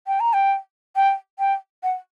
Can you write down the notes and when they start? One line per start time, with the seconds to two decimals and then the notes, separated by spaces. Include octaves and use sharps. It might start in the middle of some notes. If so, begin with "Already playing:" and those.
0.07 G5
0.20 A#5
0.33 G5
0.96 G5
1.39 G5
1.83 F#5